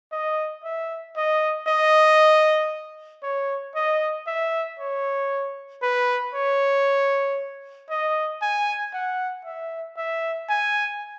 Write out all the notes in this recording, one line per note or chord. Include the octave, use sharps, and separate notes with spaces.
D#5
E5
D#5
D#5
C#5
D#5
E5
C#5
B4
C#5
D#5
G#5
F#5
E5
E5
G#5